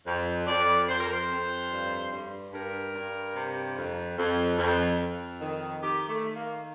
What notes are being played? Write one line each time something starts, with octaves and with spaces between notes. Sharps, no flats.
F2
F2 D5
F2 C5
A#4
C5
F2
G2
G2
G2 A#4
G2
C3
F2
F2
F2
F2
D#3
D#3 G4
A3
D#3
A#3